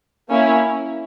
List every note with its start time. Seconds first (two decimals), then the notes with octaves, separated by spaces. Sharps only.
0.29 A#3 C#4 E4